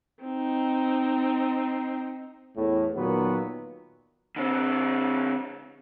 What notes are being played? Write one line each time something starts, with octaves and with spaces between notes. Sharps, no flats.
C4 D#4
E2 A2
A#2 D#3 F#3 B3
D3 C4